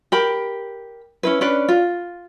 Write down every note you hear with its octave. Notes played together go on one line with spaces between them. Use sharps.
G4 A#4 B5
C#4 E4 B4
C#4 D4 B4 D5
F4